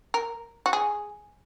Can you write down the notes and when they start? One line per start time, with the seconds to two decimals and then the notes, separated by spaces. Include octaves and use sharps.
0.14 A#4
0.66 F#4
0.73 G#4